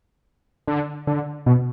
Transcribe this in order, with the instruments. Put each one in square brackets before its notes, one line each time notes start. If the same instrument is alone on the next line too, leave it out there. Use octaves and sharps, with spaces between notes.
[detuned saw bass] D3
D3
B2